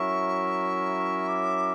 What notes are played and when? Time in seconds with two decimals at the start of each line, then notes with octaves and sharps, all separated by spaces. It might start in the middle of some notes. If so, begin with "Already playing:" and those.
Already playing: F#3 C#4 E4 A#4 E5 C#6
1.28 D6